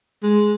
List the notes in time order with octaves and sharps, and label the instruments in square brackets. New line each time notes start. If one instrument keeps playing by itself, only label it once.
[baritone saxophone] G#3